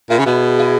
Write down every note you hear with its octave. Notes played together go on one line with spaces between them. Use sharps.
A#2 E4 G#4
C#3 F#4
B2 E4 G#4
E4 G#4